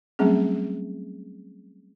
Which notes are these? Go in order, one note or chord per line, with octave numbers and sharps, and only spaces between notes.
F#3 G3 A3 C4 C#4 G#4